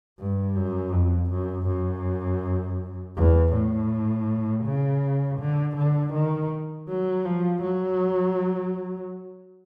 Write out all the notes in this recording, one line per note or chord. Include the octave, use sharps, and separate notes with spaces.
G2
F#2
F2
F#2
F#2
E2
A2
C#3
D3
D3
D#3
F#3
F3
F#3